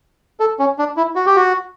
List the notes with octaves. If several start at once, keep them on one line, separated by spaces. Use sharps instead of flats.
A4
C#4
D4
E4
F#4
G4
F#4